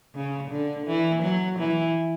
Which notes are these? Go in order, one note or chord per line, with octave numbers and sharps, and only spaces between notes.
C#3
D3
E3
F#3
E3